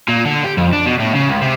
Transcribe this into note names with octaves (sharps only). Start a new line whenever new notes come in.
A#2
D3
G4
F2
D4
B2
A2
C#3
C#2
C3